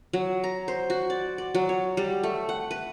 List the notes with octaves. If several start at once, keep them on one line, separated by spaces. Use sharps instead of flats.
F#3
A#5
C5
F#4
D5
D5
F#3
C#5
G3
A3
F#5
B4